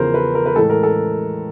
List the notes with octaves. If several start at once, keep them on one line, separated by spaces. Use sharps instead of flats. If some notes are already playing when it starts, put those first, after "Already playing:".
Already playing: E2 C#3 F3 A#4 C5
B4
A#4
B4
A2 E3 G#3 A4
A#4
A4